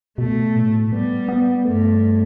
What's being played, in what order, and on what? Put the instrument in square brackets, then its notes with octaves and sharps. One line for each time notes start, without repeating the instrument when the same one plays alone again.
[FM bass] B2 [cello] A3
[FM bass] A2
[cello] G3 [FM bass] B3
[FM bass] B3
[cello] G2 [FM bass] A3